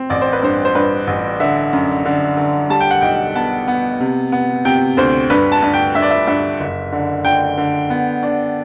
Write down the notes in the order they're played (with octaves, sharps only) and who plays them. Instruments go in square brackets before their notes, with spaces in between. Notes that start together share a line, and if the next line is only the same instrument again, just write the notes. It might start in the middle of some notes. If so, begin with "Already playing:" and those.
Already playing: [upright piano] C4
A1 D5
C5
B4
G2 C5
C5
G2 B4
A1
D3 E5
F#2
D3
D3
G3 A5
G5
F#5
B1 G5
B3 A5
B3
C3
B3
C3 G5
D2 C5
G2 B4
A5
G2
G5
G2 E5
D5
E5
G2 E5
F#1
D3
D3 G5
D3
B3
D4